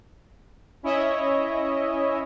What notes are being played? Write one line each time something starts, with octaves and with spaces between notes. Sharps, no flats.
C#4 E4 C#5 D#5 E5